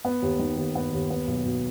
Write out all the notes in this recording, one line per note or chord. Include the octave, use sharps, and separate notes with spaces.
B3
D#2
D#3
D#2
B3
D#2
B3
B1
B2